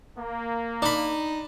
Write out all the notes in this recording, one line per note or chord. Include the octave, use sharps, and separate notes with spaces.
A#3
D4 D#4 B5